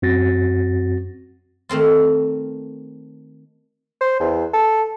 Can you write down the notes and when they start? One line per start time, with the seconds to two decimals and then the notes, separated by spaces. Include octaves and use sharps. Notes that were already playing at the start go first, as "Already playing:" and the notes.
0.02 F#2 C4 F#4 A6 A#6
1.69 D#3 A3 C4 F4
4.01 C5
4.20 E2
4.53 A4